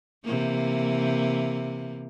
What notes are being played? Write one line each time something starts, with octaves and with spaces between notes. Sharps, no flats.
C3 E3 A#3